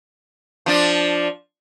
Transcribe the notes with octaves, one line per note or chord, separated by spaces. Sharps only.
F3 D4